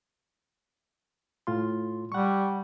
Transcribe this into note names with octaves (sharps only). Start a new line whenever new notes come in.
A2 F4 C6
G3 F#5 C#6